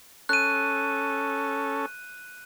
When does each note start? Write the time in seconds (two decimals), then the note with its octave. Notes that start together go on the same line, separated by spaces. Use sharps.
0.29 C#4 A4 F#6 D#7